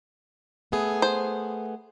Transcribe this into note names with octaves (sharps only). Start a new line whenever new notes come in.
A3 B3 G#4
C5